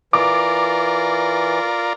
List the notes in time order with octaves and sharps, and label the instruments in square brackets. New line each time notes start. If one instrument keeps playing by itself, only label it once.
[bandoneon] E3 [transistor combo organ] F4 A#4 D5 [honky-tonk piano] D6